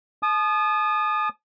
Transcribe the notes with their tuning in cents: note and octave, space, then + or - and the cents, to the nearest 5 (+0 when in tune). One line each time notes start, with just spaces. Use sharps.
A5 -45 D#6 -25